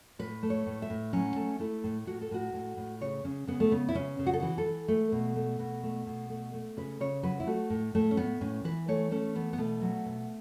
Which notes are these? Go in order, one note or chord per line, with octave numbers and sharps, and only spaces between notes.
A2 B4
A3
C#5
A2
E5
A2
F#3 C#4
A3
A3 E4
A2
A2 F#4
A4
A2 F#4
A2
A2
C#3 C#5
C#3 C#4
C#3 B3
A3
C#3 B3
E4
C#3 C#4
C#3
F#4
A4
E3 F#4
A4
E3
A3
B2
A3
B2
A3
B2
A3
A3
C#3 B4
C#3 C#5
F#3 B4
E4
A3 F#4
A2
A2 A3
C#4
A2 B3
A2 C#4
E3 B4
A3 C#5
A3 C#4
E3 B3
B3
B2 A3
F#3
B2